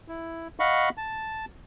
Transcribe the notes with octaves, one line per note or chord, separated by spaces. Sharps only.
E4
D#5 F5 F#5 B5 C#6
A5